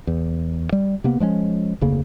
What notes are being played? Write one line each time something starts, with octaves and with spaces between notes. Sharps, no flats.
E2
G3
C3 A#3 B3
F3 G#3 A3 C#4
F1 D2 C#3 A#3